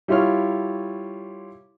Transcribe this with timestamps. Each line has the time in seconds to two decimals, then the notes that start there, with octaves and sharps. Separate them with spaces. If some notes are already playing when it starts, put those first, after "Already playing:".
0.08 G3 E4 F4 C#5 F6